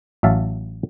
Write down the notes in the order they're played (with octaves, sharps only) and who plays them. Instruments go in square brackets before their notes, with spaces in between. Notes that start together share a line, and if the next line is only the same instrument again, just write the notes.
[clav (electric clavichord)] A1 F#3 E5 F5 A5